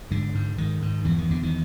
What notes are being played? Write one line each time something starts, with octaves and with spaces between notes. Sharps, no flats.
G#2 D3
G#2
G#2 D#3
G#2
E2 E3
D#3
E2 D3
D#3